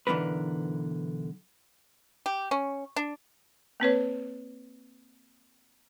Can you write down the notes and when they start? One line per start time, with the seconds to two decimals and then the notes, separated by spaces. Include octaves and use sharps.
0.07 B1 D3 E3 C4 A#4 B4
2.26 G4
2.51 C#4
2.96 D4
3.80 A#3 C4 B4 C#5